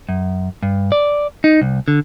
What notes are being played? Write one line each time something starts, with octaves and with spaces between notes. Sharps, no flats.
F#2
G2
D5
D#4
C2
D3